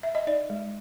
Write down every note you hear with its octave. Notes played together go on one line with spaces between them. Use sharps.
E5
D#5
D#4 D5
G#3